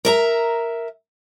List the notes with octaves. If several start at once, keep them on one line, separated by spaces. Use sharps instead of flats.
A#4 E5 A#5